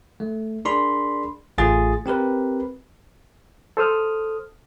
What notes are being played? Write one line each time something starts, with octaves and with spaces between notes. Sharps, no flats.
A3
D4 G#4 A#4 D5 B5 C6
A1 A3 F4 G#4 A6
C4 G4 A#4 B4
A4 C5 D#6 F6